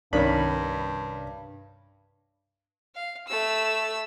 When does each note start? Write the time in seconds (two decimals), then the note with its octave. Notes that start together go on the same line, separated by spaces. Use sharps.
0.13 C2 G2 D#3 C#4 D4 C#5 B5
2.95 F5
3.28 A3 E6